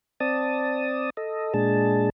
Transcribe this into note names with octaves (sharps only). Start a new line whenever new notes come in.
C4 D5 A5 D#6
A4 D#5
A#2 G#3 D4 G#4 A5